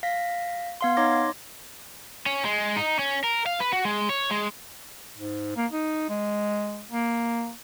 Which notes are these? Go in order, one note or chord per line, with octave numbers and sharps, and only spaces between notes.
F5 A#6 B6
B3 F5 C6
D#4 C#5 C6 D6 G#6 A#6
C#4
G#3
D#4
C#4
A#4
F5
B4
F#4
G#3
C#5
G#3
G#2
A#3
D#4
G#3
A#3